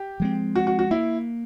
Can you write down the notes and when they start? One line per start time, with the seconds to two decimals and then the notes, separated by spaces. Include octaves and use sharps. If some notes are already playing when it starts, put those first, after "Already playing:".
Already playing: G4
0.20 F3 G#3 C4
0.56 F#4
0.67 F#4
0.79 F#4
0.91 A#3 E4